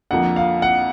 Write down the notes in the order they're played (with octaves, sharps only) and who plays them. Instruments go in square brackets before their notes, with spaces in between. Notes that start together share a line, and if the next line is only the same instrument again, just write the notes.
[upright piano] F2 D3 F3 A#3 [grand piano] F#5
[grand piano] F5
F#5